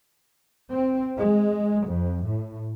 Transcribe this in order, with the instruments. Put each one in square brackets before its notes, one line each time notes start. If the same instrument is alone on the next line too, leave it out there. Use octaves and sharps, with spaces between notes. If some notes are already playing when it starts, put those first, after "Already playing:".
[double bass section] C4
G#3
F2
A2